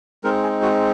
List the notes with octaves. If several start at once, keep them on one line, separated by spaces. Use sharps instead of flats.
G#3 C4 D#4 A#4
G#4
F#4